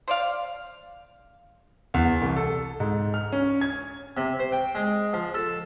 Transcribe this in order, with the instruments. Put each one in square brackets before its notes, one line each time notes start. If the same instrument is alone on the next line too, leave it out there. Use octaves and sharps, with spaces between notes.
[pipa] C5 D5 F5
[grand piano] E2
C2
A4
G#2
F6
C#4
G#6
[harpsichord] C3
C5
G5
G#3
F3
A4